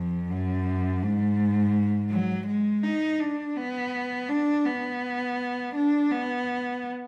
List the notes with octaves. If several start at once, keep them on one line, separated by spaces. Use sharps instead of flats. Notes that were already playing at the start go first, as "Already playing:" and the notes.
Already playing: F2
F#2
G#2
F#3
G#3
D#4
D4
B3
D4
B3
D4
B3